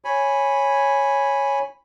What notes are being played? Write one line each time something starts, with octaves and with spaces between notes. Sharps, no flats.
C#5 G#5 B5